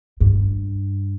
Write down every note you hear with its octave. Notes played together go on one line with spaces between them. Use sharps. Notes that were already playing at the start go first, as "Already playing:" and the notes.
G2